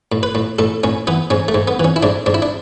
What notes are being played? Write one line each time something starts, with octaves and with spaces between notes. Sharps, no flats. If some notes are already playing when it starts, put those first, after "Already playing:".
A2
B4
A2
A2 A4
A2 C#4
E3 B3
G#2 C#4
A3
G#2
B3
E3 C#4
E4
G#2 D4
G#2 D4
E4
D4